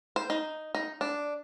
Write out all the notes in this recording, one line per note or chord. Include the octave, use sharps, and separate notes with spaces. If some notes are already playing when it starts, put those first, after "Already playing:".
C5
D#4
D#4
D4